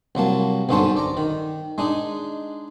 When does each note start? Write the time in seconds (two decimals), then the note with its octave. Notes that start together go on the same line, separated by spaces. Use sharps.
0.15 C2 F#3 A#3 A5
0.69 B1 G2 D3 C#4 C5 A5
0.97 D5 A#5
1.17 D#3
1.78 G#3 D4 D#4